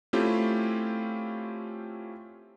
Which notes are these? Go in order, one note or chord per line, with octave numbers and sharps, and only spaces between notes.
A3 C4 C#4 E4 F4 G4